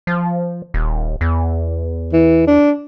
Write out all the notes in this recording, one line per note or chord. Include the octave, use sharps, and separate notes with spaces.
F3
D#1
E2
E3
D4